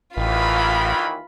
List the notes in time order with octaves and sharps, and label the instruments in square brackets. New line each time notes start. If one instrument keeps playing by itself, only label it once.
[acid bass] A1 [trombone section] D#2 D#3 E3 [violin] F4 B5